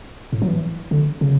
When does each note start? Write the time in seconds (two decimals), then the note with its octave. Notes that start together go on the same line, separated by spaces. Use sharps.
0.33 A2
0.42 F#3
0.48 E3
0.91 D3
1.21 C#3